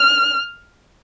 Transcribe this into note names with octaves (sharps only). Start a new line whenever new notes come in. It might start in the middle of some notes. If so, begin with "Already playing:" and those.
Already playing: F6